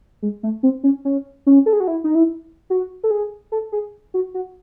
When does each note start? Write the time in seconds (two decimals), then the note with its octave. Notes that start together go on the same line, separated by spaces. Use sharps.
0.22 G#3
0.43 A3
0.63 C4
0.84 C#4
1.05 C#4
1.46 C#4
1.66 A4
1.73 G#4
1.80 F#4
1.88 E4
2.04 D#4
2.15 E4
2.70 F#4
3.03 A4
3.11 G#4
3.52 A4
3.72 G#4
4.14 F#4
4.34 F#4